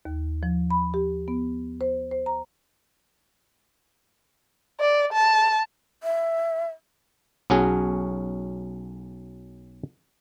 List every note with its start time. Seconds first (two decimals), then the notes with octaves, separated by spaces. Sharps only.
0.05 D#2
0.43 F3
0.71 B5
0.94 G4
1.28 B3
1.81 C5
2.11 C5
2.26 A#5
4.80 D5
5.13 A5
6.03 E5
7.50 B1 F#3 C#4 F#4 G#4